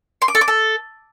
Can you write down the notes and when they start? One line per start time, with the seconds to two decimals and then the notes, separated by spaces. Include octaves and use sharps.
0.22 C6
0.28 D6
0.35 A4
0.41 D6
0.48 A4